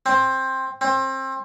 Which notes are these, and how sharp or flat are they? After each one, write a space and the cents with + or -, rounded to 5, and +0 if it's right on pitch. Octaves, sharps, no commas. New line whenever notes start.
C4 +10
C4 +25